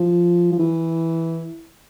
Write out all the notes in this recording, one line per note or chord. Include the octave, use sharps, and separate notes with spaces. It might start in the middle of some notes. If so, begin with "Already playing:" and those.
Already playing: F3
F3
E3